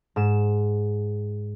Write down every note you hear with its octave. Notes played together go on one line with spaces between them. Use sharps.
G#2 E7